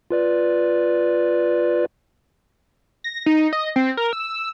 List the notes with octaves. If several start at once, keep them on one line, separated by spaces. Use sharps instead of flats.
F4 B4 D5
A#6
D#4
D#5
C4
A#4
E6